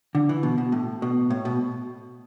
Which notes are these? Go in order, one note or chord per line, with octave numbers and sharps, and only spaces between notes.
D3
E3
B2
B2
A2
B2
A2
B2